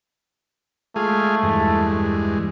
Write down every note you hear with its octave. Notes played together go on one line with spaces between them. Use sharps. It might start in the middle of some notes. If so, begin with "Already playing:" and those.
G#3 A3 F4 G#4
E2 G2 G#3